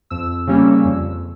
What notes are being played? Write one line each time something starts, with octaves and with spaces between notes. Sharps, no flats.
F2 E6
C#3 G3 A#3 C#4
F2